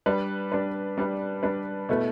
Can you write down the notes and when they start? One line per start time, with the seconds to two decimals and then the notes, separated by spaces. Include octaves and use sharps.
0.06 G3 D4 B4
0.52 G3 D4 B4
0.98 G3 D4 B4
1.43 G3 D4 B4
1.89 B2 A3 E4 B4